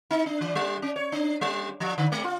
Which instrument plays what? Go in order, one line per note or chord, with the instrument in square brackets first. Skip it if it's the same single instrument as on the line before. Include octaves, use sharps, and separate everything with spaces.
[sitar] D#4
D4
E3
G3
C#4
C#5
D4
G3
F3
D3
G#3
F4